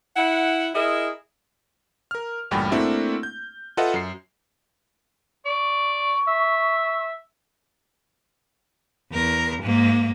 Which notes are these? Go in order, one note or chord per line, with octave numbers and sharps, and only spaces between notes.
E4 F#5
E4 G#4 A#4 D#5 E5
A#4 F6
A1 D2 G2 A#2 G5 B5
A3 A#3 C4 D4 E4 F#4
G6
F4 A4 B4 D#5 E5 F#5
F#2 C7
D5 C#6
E5
E2 A#4
G#2 A#3